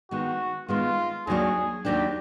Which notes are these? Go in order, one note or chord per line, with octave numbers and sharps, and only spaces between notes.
D#3 G#3 B3 F#4
D#3 G#3 B3 F4
D#2 D#3 F#3 A#3 D4 G#4
D#2 D#3 F#3 A#3 D4 G4